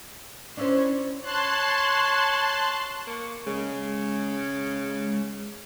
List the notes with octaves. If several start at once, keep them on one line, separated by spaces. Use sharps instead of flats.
C#4 D4 E4 C5
C#5 A5 C6 F#6
A#3 C#6
C#3 G#3